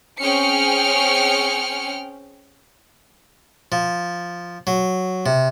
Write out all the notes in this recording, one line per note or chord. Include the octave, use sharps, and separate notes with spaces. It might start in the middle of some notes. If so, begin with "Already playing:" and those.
C4 C#4 G#4 G5 F6 C#7
F3
F#3
C3